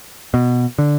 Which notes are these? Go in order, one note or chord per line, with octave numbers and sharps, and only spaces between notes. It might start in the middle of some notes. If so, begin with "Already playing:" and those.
B2
D3